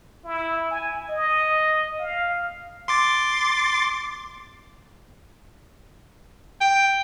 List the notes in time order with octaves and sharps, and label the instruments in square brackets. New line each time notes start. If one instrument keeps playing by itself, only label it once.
[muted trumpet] E4
G#5
D#5
F5
[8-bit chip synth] C6 D6 A6
[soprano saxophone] G5